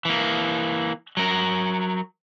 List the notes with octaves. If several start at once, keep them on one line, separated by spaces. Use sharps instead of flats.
E3 A#3
F#3 A#4